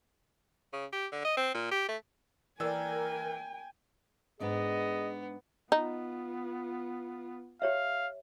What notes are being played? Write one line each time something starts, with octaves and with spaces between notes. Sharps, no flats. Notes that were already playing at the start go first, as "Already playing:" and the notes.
C#3
G4
D3
D#5
C4
A#2
G4
A3
E3 A#3 G#4 A#4 D5 G5 G#5 E6
G#2 B3 D4 G#4 D5 D#5
B3 D#4 F4
G4 C#5 E5 F5